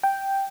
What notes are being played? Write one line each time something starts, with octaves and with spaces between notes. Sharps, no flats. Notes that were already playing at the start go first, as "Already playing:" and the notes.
G5